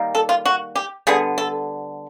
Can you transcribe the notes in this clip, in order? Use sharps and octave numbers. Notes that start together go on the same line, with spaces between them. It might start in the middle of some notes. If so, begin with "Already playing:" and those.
Already playing: D#3 G3 A#3
A4
F4
F#4
G4
D3 G3 B3 G#4
A4